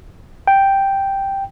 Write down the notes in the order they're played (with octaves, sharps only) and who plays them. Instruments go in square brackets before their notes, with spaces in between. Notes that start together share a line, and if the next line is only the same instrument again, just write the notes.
[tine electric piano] G5